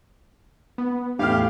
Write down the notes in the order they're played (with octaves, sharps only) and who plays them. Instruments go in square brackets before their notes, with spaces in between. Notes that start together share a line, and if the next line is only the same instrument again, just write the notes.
[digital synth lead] B3
[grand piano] E2 F6 [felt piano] A2 [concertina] G4 [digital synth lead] F5